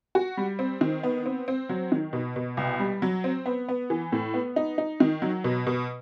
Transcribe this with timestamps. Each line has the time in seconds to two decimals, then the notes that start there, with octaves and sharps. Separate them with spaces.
0.15 F#4
0.37 G3
0.59 C4
0.81 D#3
1.03 B3
1.26 C4
1.48 C4
1.69 F#3
1.92 D#3
2.13 B2
2.36 B2
2.57 C2
2.80 G3
3.02 F#3
3.24 C4
3.46 B3
3.68 B3
3.90 E3
4.12 A2
4.34 B3
4.56 D#4
4.78 D#4
5.00 D#3
5.22 F#3
5.44 B2
5.67 B2